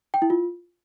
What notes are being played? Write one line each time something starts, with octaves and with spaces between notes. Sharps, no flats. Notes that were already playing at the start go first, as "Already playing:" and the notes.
G5
E4
F4